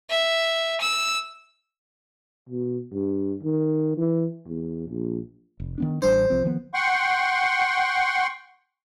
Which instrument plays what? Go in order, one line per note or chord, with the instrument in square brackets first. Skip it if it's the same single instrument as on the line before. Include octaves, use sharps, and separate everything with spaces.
[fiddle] E5
E6
[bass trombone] B2
G2
D#3
E3
E2
A#1
[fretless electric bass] F1
D#3 B3 D4
[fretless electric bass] A1 G3 D4 [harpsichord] C5
[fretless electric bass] C2 F3 C4
D#3 F3 B3
[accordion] F#5 G5 C6 C#6